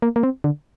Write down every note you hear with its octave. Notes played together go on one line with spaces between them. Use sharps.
A#3
A#3
C4
D3